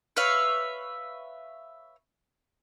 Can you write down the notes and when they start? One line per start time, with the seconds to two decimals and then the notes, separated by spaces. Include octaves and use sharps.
0.17 B4 C#5 E5 F5